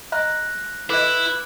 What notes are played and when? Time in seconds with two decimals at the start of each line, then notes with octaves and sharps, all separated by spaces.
0.12 D#5 A#5 F6 F#6 A#6
0.90 E4 A4 B4 D#5 D6 F#6